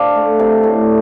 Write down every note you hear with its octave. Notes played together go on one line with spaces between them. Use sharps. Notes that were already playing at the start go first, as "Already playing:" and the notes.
Already playing: C3 C4 D4 D5 F5
A3
C3
A2